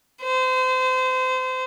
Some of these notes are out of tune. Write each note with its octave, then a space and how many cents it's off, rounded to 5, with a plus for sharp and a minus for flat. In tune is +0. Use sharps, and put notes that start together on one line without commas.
C5 -30